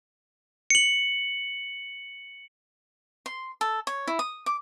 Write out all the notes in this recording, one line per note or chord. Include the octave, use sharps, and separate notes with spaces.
C#7 F#7
C6
A4
C#5
E4
D#6
D6